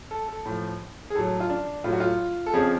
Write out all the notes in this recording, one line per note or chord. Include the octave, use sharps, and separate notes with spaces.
A4
A4
A2 F3
G#4
A2 F#3 A4
F4
D4
A2 F#3 F4
F#4
F4
A4
F2 C#3 F3 G#4